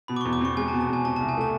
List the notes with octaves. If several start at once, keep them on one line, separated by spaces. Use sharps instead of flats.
B2 B5
D6
E2 C#6
D6
C4 C#6
G#3 G#5
A5
B2
A5
E2 G#5
C3 A5
C2 A5
G#5
A3 A5